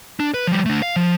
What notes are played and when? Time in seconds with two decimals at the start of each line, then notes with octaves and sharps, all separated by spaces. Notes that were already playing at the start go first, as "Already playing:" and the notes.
0.20 D4
0.34 B4
0.47 F3 G3
0.66 A3 D4
0.82 F5
0.96 F3